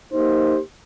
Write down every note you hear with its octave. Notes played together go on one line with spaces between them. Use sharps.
A#3 D#4 G4 C5